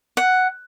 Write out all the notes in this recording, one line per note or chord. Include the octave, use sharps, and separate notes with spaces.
F#5